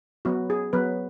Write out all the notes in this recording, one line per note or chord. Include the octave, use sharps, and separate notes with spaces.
F#3 B3 F#4
G#4
F#3 B3 B4